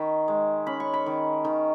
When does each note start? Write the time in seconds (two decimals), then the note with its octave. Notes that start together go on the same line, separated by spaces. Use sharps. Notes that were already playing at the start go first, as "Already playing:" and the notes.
Already playing: D#3 D#4 B5 C#6
0.28 G#3
0.67 C#4 B5
0.80 C#6
0.94 B5
1.06 D#3
1.45 D#3